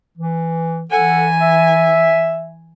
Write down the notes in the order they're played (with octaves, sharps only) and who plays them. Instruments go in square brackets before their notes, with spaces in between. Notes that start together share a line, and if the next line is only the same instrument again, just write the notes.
[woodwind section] E3
[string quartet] E3 G#5 [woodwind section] A4 F#5
[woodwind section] E5